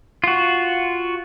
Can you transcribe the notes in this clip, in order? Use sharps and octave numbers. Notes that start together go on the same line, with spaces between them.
F4 F#4